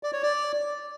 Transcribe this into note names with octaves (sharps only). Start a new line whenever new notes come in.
D5
C#5
D5